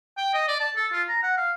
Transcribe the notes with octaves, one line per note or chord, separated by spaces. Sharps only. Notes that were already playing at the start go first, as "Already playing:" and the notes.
G5
D#5
D5
A5
A4
F4
A#5
F#5
F5